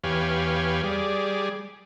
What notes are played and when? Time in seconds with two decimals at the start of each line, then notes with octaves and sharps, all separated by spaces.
0.04 E2 G4 B4 C#5 F5 G#5
0.83 G3 G#4 D5